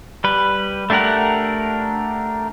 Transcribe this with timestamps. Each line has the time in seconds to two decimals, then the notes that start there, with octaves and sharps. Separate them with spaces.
0.24 G3 B4
0.90 A3 D4 G4 A#4 F#5